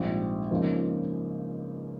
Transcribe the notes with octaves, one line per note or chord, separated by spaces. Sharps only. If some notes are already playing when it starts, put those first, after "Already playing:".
Already playing: A#1 G#2 G3 C4 F4
C#2 C#3 F3 A#3 D#4